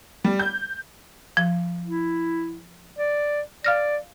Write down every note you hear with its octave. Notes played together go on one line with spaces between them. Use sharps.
G3
G6
F3
E4
D5
D5 F5 F6 A#6